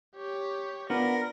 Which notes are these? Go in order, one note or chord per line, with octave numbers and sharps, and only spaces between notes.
G4 C#5
B3 D4 F4 A#4 A#6